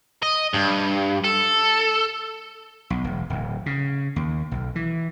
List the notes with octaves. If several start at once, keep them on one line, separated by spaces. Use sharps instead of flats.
D#5
G2
A4
B1
E1
D1
C#3
D#2
B1
E3